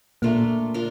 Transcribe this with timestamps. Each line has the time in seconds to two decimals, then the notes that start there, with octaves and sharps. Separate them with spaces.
0.22 A#2 A3 A#3 D4 F4 A#4
0.74 D4 F4 A#4